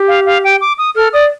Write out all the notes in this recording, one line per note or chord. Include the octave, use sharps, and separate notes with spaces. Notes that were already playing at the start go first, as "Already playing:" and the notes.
Already playing: G4
F5
F5
G5
D6
D#6
A4 F6
D5 D#6